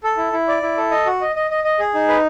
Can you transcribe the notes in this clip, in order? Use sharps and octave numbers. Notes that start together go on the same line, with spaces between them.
A4
E4
E4
D5
E4
A4
D#5
F#4
D#5
D#5
D#5
D#5
G#4
D#4
B4